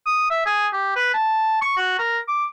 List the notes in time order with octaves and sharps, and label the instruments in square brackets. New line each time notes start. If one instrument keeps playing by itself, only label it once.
[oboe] D#6
E5
G#4
G4
B4
A5
C#6
F#4
A#4
D6